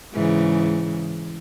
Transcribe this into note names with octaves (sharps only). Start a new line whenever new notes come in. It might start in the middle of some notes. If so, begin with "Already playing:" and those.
G#2 C#3 E3